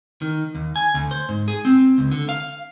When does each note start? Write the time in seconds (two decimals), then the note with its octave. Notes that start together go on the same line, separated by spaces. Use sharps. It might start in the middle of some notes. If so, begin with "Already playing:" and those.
0.22 D#3
0.55 D#2
0.76 G#5
0.94 D2
1.11 C5
1.29 G#2
1.48 G#4
1.65 C4
1.98 C#2
2.11 D3
2.29 F5